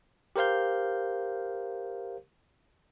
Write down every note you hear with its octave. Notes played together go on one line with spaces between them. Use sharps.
G4 A#4 C5 F5 G6